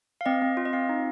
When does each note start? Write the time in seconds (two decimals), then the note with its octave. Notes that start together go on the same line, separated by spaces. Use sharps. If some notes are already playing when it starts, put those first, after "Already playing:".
0.21 F5
0.26 C4 D#5
0.42 C4
0.57 F4
0.65 D#5
0.73 C4 F5
0.89 D#4